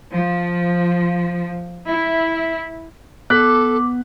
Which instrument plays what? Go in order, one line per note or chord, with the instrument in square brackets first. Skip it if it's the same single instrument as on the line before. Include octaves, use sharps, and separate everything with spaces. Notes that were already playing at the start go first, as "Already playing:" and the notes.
[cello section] F3
E4
[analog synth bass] B3 [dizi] A4 [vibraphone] D6 [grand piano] F#6 B6